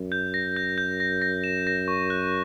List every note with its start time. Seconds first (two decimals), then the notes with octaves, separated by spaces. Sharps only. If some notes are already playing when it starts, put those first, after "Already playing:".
Already playing: F#2
0.12 G6
0.34 A#6
0.56 G6
0.78 G6
1.00 A#6
1.22 A#6
1.44 E7
1.67 A#6
1.88 C#6
2.10 F#6